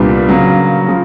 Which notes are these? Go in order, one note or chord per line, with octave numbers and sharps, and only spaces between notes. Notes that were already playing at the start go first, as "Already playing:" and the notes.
Already playing: C2 A#2 G3 B3 D4
C#3 F#3 A#3
C#3 F3